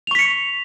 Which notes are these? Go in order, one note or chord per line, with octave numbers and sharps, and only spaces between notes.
C#6 B6 C#7 F7